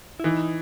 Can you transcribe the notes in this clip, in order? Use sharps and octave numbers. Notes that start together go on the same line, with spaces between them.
E4
E3 D#4